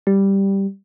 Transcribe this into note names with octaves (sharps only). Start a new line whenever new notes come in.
G3